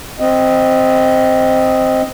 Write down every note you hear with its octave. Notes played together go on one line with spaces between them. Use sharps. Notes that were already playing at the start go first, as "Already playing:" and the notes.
C4 D#5